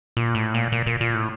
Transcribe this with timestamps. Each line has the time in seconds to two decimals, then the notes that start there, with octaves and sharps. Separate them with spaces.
0.17 A#2
0.35 A2
0.54 A#2
0.72 A#2
0.87 A#2
1.01 A#2
1.14 A2